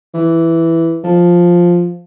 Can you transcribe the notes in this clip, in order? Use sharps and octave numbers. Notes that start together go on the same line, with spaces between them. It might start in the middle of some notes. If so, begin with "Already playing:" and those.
E3
F3